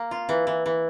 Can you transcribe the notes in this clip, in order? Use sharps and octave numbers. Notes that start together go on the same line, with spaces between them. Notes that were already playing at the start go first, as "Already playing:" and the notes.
Already playing: A#3
F4
E3
E3
E3